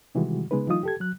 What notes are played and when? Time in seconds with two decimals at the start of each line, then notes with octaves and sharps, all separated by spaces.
0.15 C3 D#3 E3 G3 G#3 F#4
0.51 C#3 G#3 B3 D#4 B4
0.67 E3 F#3 A3 D#4 F4 D#6
0.83 G4 A4 G#6
1.00 F#3 F#6